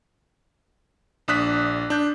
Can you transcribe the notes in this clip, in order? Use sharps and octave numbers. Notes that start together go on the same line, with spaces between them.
A#1 D4 D#6 F#6 B6
D4 G6